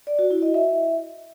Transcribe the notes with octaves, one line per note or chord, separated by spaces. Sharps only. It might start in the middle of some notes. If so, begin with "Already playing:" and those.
D5
F#4
E4
D#5
E5